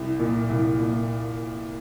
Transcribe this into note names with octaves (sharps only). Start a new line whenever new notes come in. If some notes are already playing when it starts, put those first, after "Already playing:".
Already playing: C2
A#2
C2
A#2